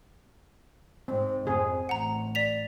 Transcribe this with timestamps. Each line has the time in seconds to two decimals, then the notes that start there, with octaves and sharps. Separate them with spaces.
1.08 G#2 C4
1.47 F2 C4 G#4
1.89 A1 F#5 A#5
2.35 D5 B6 F7